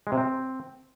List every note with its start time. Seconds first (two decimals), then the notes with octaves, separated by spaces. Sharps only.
0.07 G#3
0.12 C3
0.17 C4